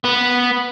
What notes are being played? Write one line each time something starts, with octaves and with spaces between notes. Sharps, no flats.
B3